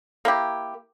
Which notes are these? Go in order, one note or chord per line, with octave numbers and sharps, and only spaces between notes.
A#3 E4 G4